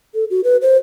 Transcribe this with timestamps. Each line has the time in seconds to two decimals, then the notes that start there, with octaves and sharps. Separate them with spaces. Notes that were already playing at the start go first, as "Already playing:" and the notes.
0.15 A4
0.30 F#4
0.44 B4
0.62 C5